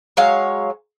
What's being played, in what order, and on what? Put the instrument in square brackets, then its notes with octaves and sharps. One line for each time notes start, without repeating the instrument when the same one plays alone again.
[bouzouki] F#3 G#3 C#5 F5